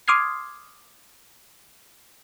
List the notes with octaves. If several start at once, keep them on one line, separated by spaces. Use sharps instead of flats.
C6 D6 D#6 F6 G#6 C7